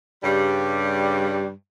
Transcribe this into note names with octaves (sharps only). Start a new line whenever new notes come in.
G2 C#3 G3